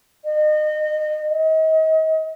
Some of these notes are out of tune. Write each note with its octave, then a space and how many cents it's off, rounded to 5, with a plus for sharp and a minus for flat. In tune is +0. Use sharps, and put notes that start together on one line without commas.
D#5 -30
D#5 +35